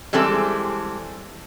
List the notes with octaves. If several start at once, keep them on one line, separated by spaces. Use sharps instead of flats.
E3 G3 G#3 C4 A4